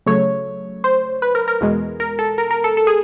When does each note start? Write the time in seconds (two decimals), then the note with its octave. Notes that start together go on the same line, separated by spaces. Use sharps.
0.06 C#3 F#3 A3 C#5
0.84 C5
1.22 B4
1.35 A#4
1.48 A#4
1.61 E2 B2 G#3
2.00 A#4
2.19 A4
2.38 A#4
2.51 A#4
2.64 A4
2.77 A4
2.87 G#4